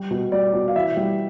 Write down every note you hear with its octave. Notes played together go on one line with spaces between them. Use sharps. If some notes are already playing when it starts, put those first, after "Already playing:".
Already playing: G3
B2
G3 D5
B2
F5
E3 E5
G3